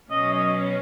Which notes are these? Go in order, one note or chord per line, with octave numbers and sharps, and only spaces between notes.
B2 F#3 C#4 D#5
D#5